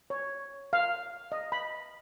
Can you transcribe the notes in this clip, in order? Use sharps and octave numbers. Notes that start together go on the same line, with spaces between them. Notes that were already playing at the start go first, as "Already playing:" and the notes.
C#5
F5
D#5
B5